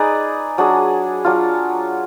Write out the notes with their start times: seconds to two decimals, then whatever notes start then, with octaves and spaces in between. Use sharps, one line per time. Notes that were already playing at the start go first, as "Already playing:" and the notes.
Already playing: D#4 G#4 B4 D5
0.58 F#3 D4 G#4
1.24 F#3 D4 F4